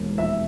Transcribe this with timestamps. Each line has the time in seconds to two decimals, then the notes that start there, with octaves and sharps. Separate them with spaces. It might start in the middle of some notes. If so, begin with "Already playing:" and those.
Already playing: E1 D#2
0.18 A#1 E5